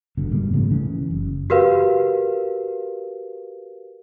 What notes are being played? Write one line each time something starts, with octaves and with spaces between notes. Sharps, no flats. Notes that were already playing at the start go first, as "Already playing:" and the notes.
F#1 B2 D3
G#2 B2 G3 A#3
C#3 F3 G3 A3
C#3 E3 C#4
F#1
F#4 G4 A#4 B4 F5